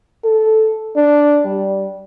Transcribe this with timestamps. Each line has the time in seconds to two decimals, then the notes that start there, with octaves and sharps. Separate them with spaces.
0.24 A4
0.96 D4
1.45 G3